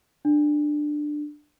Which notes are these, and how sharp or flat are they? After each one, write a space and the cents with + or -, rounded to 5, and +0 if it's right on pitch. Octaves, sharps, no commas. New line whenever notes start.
D4 +15